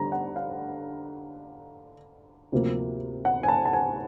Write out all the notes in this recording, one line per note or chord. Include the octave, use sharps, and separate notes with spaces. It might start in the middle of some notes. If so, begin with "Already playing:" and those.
Already playing: D3 G3 A#5
F#5
F5
D2 C3 F3 A#3
F#5
G#5
A5
A5
G#5